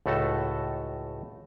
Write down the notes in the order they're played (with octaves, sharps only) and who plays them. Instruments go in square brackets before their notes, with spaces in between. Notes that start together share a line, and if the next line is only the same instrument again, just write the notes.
[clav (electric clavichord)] C#2 A2 A3 F#4 A4 A5